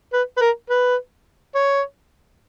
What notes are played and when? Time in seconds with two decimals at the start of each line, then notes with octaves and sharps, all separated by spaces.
0.13 B4
0.37 B4
0.41 A#4
0.69 B4
1.55 C#5